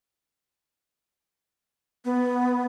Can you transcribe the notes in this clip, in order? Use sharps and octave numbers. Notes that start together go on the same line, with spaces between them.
B3